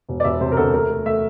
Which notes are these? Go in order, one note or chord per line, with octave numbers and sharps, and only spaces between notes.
E1
D5
E1 E5
C3 C5
A#4
D2 A4
A3 A#4
A3
A3 E5